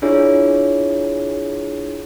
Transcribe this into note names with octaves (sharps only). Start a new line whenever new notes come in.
D4 E4 F4 G#4 C#5